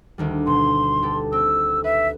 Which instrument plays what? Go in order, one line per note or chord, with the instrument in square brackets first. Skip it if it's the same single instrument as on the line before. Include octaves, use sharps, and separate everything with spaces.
[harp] D2 D#3 G3
[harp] B2 [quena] C6
[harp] B2 G4 A4
[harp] C4 [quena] E6
[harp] B4 [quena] E5